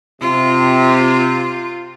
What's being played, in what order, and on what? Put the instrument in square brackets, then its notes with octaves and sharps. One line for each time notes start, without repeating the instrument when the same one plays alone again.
[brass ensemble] C3 [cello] F4